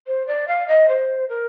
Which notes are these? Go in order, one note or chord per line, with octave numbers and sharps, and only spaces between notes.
C5
D5
F5
D#5
C5
A#4